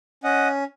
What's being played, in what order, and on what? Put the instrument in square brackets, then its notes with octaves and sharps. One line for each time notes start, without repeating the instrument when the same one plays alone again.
[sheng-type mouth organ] C#4 D#5 F#5